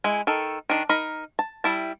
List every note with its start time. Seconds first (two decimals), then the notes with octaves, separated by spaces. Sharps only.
0.04 G#3 E4
0.27 D#3 A4
0.70 D#3 D4
0.89 D#4 A#4 B5
1.39 A5
1.64 G3 E4 A5